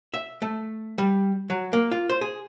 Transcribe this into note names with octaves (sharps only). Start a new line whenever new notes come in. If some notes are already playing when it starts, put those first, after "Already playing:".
E5
A3
G3
F#3
A#3
F4
C5
G#4